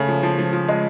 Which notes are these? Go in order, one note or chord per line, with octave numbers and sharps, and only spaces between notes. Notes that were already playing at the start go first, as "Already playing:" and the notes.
Already playing: C#3 A3
F3
F3
F3
F3
G#3